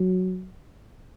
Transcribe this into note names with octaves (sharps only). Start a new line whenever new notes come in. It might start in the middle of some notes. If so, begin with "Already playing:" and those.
Already playing: F#3